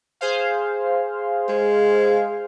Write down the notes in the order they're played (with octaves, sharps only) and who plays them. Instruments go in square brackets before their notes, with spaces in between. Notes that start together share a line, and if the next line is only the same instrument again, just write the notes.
[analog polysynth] G#4 C5 F5
[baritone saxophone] G#3